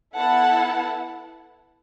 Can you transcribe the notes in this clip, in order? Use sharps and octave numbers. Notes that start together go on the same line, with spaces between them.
B3 E4 A4 F#5 A5